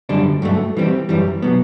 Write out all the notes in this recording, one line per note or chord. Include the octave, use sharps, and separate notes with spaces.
F#2 D3 G3 D4
G2 F#3 A3
E3 G3 C4
F#2 E3 G3
B2 F#3 B3